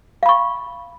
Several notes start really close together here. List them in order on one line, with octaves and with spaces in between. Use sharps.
F5 B5 C#6